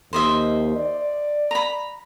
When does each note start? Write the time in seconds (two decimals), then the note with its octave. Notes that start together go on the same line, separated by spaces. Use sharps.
0.13 D#2 C5 D#5 E5
0.76 D5
1.51 A#5 B5